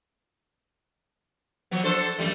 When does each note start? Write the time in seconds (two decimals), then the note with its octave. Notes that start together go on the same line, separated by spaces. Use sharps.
1.71 F3 F#3 B3
1.83 D4 A4 C5
2.18 F#2 G3 A3